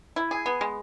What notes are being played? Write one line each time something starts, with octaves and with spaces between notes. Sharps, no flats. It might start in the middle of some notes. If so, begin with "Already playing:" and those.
E4
G#4
B3
G#3